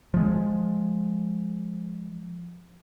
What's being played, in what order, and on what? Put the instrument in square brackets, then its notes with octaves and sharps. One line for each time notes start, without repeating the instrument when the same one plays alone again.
[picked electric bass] F3 G#3